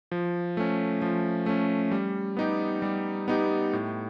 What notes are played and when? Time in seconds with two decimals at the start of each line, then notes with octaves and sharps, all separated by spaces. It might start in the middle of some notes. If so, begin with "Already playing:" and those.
0.12 F3
0.57 A3 C#4
1.02 F3
1.46 A3 C#4
1.91 G3
2.37 B3 D#4 G4
2.82 G3
3.28 B3 D#4 G4
3.73 A2